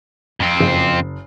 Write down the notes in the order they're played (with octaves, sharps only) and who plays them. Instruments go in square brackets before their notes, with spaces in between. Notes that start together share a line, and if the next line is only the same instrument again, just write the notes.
[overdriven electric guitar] F2 C4
[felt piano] F#1 C7